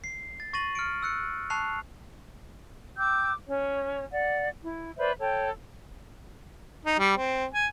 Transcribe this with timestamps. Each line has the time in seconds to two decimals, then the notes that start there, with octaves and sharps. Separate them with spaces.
0.04 C7
0.40 A6
0.53 C#6 A6 A#6 D#7 F#7
0.75 F6 C#7 D7
1.02 E6 F#6 C#7
1.50 A5 C#6 F#6 C7 F7
2.97 G5 D6 E6 G6
3.47 C#4 C#5
4.11 D5 F#5
4.64 E4
4.97 B4 C5 D5 E5
5.19 A4 C#5 G5
6.85 D#4
6.99 G3
7.17 C4
7.53 G#5